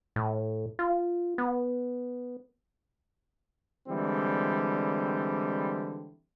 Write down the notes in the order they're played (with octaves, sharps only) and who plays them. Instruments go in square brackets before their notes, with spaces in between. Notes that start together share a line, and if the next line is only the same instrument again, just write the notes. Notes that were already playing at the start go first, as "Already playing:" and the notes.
[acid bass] A2
F4
B3
[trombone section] D3 E3 G3 G#3 C4